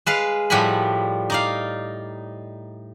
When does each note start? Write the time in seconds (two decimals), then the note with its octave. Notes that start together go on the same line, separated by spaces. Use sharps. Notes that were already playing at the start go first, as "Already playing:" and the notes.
0.06 G#3 B4 F5
0.50 A2 F3 G3 F#5 G#5 B5
1.30 D#4 D5 F5